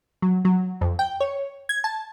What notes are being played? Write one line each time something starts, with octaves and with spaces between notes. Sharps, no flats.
F#3
F#3
F2
G5
C#5
G#6
A5